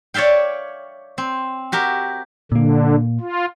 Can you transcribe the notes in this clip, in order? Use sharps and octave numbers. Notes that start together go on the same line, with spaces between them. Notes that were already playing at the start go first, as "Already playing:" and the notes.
C#5 D5 E5 F5 G5
C4
F#4 G4 A#4 E5
A#2 D3 A#3
F4